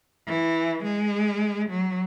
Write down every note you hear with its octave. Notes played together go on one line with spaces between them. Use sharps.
E3
G#3
F#3